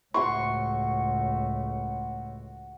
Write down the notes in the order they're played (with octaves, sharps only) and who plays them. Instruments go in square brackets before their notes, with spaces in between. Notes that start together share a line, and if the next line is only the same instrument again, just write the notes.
[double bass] C#2 A2 [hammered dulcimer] F#4 C6 C#6